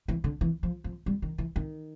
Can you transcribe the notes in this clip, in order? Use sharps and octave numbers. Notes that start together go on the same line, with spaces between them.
E3
D3
E3
F3
F3
G3
D#3
E3
D#3